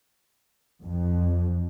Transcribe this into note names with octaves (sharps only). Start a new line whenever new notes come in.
F2